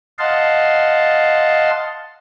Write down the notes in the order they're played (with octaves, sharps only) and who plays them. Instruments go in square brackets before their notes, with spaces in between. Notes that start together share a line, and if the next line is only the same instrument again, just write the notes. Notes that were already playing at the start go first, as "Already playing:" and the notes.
[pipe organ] D#5 F5 F#5 A5 C6